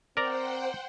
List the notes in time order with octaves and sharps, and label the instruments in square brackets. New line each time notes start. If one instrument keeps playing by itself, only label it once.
[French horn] C4 [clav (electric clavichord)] A#4 D5 A#5 [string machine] C5 F#5 G5